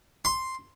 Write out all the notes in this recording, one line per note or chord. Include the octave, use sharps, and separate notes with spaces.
C6